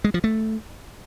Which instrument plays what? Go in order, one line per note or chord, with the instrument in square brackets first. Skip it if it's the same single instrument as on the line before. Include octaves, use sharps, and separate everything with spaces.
[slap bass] G#3
F3
A3